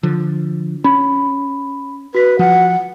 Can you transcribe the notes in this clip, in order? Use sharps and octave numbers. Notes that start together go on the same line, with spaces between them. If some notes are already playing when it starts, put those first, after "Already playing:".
D3 F3
C#4 B5
F#4 B4 B6
F3 F#5